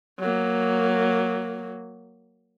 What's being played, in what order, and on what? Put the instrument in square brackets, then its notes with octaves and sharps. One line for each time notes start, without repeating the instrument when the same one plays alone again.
[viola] F#3 A#3